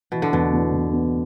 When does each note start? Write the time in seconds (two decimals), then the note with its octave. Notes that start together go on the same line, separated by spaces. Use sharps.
0.12 B2 E3
0.22 D3
0.32 E2 B2
0.53 E2
0.73 E2
0.93 B3